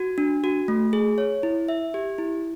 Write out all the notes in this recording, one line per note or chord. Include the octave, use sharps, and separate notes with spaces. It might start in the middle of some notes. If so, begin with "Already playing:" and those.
Already playing: F#4
D4
F#4
A3
G#4
C#5
E4
E5
G4
E4